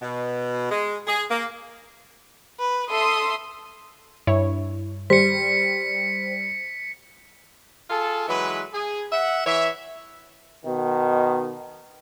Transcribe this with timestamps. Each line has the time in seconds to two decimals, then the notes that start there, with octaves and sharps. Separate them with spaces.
0.02 B2
0.71 G#3
1.07 G#4
1.31 A#3
2.60 B4
2.91 A4 E5 C6 D#6
4.27 G2 E4 C#5
5.10 G3 C5 B6 C#7
7.90 F4 G#4 A4
8.28 E3 F#3 G#3 B4
8.74 G#4
9.12 E5 F#5
9.46 E3 C#5 E5
10.66 B2 D#3